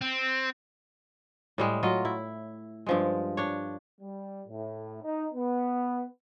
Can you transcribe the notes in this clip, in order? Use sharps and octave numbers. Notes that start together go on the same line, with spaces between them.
C4
A2 G3 G#3
F#3 F4 D#5
E4
G2 F3 G#3
D4 C#5
G3
A2
D#4
B3